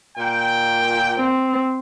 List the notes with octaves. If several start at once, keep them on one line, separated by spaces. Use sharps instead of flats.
A#2 G5
C4